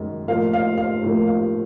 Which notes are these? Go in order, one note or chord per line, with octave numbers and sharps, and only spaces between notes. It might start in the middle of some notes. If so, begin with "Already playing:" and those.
Already playing: F#2 D#3 G#3
A2 F3 A#3 F5
F5
F5
A2 F3 A#3
F5